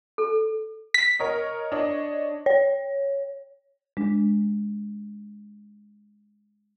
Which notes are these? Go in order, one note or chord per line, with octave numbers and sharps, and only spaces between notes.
A4
B6
A#4 C#5 D#5
D4 C#5 D#5
C#5
G#3 D4